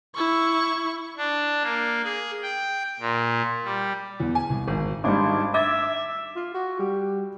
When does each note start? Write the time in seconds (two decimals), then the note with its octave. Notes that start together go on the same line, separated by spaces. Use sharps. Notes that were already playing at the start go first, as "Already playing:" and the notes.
0.16 E4 C#6
1.17 D4
1.63 A#3
2.04 G#4
2.42 G5
3.00 A#2
3.64 G3
4.20 E2
4.35 G#5
4.50 C2
4.68 G#1
5.04 G#1 G#2 G3 D4
5.54 E5 D6 G#6 A6
6.36 F4
6.54 F#4
6.79 G3